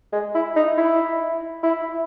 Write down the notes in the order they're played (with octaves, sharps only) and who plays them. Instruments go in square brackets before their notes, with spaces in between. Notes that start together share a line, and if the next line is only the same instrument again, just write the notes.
[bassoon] G#3
E4
D#4
E4
E4